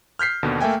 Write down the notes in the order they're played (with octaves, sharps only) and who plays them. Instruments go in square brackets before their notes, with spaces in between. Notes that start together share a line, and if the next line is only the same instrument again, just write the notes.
[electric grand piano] F6 G6 B6 C7
D#2 B2 D3
A3 A#3 E5 G5 G#5